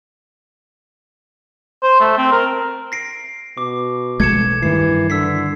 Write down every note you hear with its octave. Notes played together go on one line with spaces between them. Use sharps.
C5
A3
C4
A#4
A#6 C7 D7
B2 D6
B1 G#3 A3 G#6 C#7 E7
G2 D#3 E3 C7
D3 E6 B6 C7